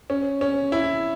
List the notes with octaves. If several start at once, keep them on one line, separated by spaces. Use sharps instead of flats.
C#4
C#4
E4